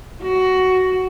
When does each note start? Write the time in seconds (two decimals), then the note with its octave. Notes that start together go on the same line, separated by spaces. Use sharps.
0.22 F#4